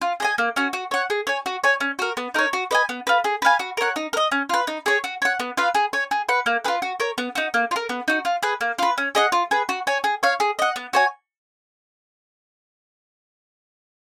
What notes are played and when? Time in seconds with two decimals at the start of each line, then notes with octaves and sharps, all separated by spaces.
0.01 F4
0.20 G#4 D#5 G#5
0.38 A#3
0.56 C#4 F#4
0.73 F#4
0.91 C#5 F#5
1.10 G#4
1.27 C#5 G#5
1.46 F#4
1.64 C#5 G#5
1.80 C#4
1.99 F#4 A#4
2.17 B3
2.34 D#4 A#4 C#5
2.53 F#4
2.71 B4 D#5 G#5
2.89 B3
3.07 F4 B4
3.24 G#4
3.42 B4 F5 G#5
3.59 F#4
3.77 A#4 C#5 F#5
3.96 D#4
4.13 A#4
4.17 D#5
4.32 C#4
4.49 F4 B4
4.67 D#4
4.86 G#4 C#5
5.04 F#4
5.22 C#5 F#5
5.40 B3
5.57 F4 B4 F5
5.75 G#4
5.93 C#5 G#5
6.11 G#4
6.29 B4 F#5
6.46 A#3
6.64 F4 G#4 B4
6.82 F#4
7.00 A#4 C#5
7.18 B3
7.35 D#4 F#4
7.54 A#3
7.71 F4
7.76 A#4
7.89 B3
8.08 D#4 F#4
8.25 F4
8.43 G#4 B4
8.61 A#3
8.79 F4 B4
8.98 C#4
9.15 G#4 D#5 F#5
9.32 F4
9.51 G#4 B4
9.69 F#4
9.87 C#5 G#5
10.04 G#4
10.23 C#5 F5
10.40 G#4
10.59 D#5 F#5
10.76 B3
10.93 F#4 C#5 G#5